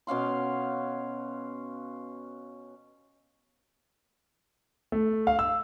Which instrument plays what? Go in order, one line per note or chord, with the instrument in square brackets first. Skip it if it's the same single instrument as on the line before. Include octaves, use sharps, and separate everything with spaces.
[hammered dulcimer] B2 C#4 F5 C6
[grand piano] A3
F5
E6